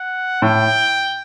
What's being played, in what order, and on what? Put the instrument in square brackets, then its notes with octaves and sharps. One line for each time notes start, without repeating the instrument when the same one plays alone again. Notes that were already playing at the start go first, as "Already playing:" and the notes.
Already playing: [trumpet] F#5
[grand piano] A2 [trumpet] G5